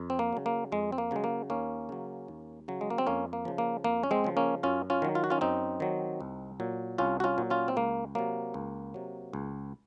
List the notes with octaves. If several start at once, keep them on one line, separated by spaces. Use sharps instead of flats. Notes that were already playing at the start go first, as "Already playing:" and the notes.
Already playing: F2
C4
A#3
C#3 F#3
A#3
F2 G#3
C4
A#3
C#3 F#3 G#3
A#3
D#2 A#3 C#4
C#3 F#3
D#2
C#3 F#3
G#3
A#3
C4
F2 A#3 C#4
A#3
C#3 F3
A#3
F2 A#3
C#4
G#3 C4
C#3 F3
A#3 C#4
F#2 C#4 F4
C#4 F4
D#3 F#3
F4
F#4
C#4 F4
F#2 C4 D#4
D#3 F#3
C2
A#2 F#3
C2 C#4 F4
F#4
C#4 F4
A#2 F#3
C#4 F4
C4
C#2 A#3
C3 F#3 A#3
C#2
C3 F#3
C#2